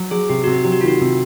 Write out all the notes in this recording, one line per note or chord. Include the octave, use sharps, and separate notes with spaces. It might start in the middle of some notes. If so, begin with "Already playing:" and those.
Already playing: F#3
F#3 G#4
C3 G4
C3 F#4
G4
F#3 G4
F#4
D#3 F4
F#4
C3